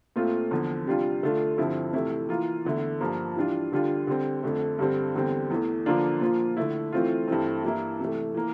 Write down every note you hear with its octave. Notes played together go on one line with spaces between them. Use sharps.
A#2 A3 C4 F4
E2 D3 F3
C3 G3 D4 F4
D3 A3 D4 F4
G2 D3 F3 C4 E4
C3 E3 A3 E4
E3 A#3 F4
E2 D3 A3 E4
G2 F3 A#3
E3 G3 D4 F4
D3 G3 D4 F4
D3 G3 C4
F2 D3 A3
G2 D3 G3 C4
E2 D3 G3 C4
E2 E3 A3
D3 F3 A#3 D4 F4
A#2 F3 A#3 F4
D3 A3 E4
E3 A3 C4 F4
G2 E3 A3 C4
G2 E3 A#3 E4
C3 E3 A3
E3 A#3